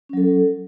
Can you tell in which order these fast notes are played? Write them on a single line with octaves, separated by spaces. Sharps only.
C#4 F#3 A4